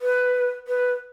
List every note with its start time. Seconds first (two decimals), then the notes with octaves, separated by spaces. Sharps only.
0.02 B4
0.68 B4